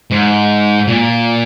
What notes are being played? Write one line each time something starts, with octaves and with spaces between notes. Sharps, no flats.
G#2
A#2